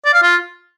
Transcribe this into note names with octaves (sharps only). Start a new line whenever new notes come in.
D5
F5
F4